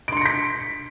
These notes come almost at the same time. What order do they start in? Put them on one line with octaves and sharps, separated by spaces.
D7 C6 C#7 A#6 B6